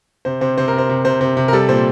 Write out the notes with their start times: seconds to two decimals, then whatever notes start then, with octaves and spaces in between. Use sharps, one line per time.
0.25 C3 C5
0.41 C3 C5
0.58 C3 C5
0.68 A#4
0.73 C3
0.78 C5
0.89 C3
1.05 C3 C5
1.21 C3 C5
1.37 C3
1.48 A#4
1.53 G3 A4
1.69 A#2 C5